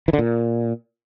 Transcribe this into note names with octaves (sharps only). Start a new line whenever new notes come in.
E3
D3
A#2